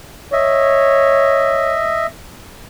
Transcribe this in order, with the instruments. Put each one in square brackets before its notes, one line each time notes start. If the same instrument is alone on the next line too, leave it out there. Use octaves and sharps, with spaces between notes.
[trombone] C#5 [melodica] D#5 E5